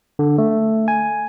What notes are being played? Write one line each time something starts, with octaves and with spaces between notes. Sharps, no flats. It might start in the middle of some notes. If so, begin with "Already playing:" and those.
D3
A3
G#5